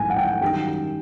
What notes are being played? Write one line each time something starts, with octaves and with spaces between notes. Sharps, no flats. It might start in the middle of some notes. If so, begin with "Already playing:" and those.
Already playing: A1 G#2 E3 G#5
F#5
G5
F#2 D#3 G3 G5